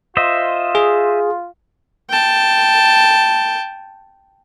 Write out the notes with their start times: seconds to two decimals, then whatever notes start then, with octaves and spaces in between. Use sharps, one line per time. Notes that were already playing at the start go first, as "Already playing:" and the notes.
0.17 F4 C5 D#5 E5
0.75 G#4
2.10 G5 A5